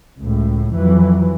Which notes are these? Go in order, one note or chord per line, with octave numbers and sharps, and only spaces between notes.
C#2 A2
F2 E3 F#3